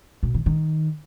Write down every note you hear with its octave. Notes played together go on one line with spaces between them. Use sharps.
B2
D#3
D#3